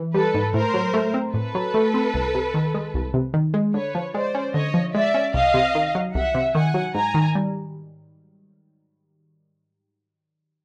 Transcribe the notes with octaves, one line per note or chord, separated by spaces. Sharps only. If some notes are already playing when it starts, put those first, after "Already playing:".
Already playing: E3
G3 A4 B4
G#2
A2 A#4 C5
F#3
A3
C4
A2 A4 B4
F#3
A3
C4
C2
C3
D#3
G#3
C2
C3
D#3
G#3
D3 B4 C#5
F3
G#3 C5 D5
C#4
D3 C#5 D#5
F3
G#3 D5 E5
C#4
C2 D#5 F5
C3
D#3
F#3
C2 E5 F#5
C3
D#3 F#5 G#5
F#3
G#2 G#5 A#5
D#3
G3